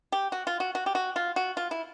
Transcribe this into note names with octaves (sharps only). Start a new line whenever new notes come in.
G4
F#4
F4
F#4
F#4
G4
F#4
F4
F#4
F4
E4